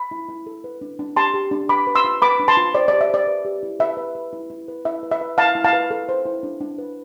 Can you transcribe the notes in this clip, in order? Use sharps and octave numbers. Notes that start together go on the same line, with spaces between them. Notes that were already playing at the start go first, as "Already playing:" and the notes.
Already playing: B5
E4
E4
A4
B4
D4
D4
G4 A5 C6
G4
D4
B4 B5 D6
B4
C6 E6
F4
B4 B5 D6
D4
A5 C6
F4
C5 D5
D5
G4
E5
C5 D5
B4
G4
E4
B4 E5
B4
B4
E4
E4
B4
E4 E5
B4
E5
B4
E4 F5 A5
E4
F5 A5
B4
A4
C5
E4
D4
D4
B4